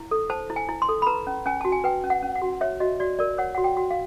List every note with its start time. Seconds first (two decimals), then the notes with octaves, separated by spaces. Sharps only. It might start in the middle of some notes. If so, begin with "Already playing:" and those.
Already playing: E4
0.11 A4
0.30 C5 A5
0.50 E4
0.56 G#5
0.69 E4
0.82 C6
0.89 A4
1.02 B5
1.07 B4 A#5
1.27 C#4
1.46 C#4 G#5
1.61 F#4 A5
1.72 G#5
1.84 B4 G5
2.04 C#4
2.10 F#5
2.22 C#4
2.35 F#5
2.42 F#4
2.61 C#5 E5
2.80 F#4 D#5
3.00 F#4 D5
3.19 A#4 D5
3.38 C#5 F#5
3.55 F#4 F#5
3.64 G5
3.77 F#4
3.91 F5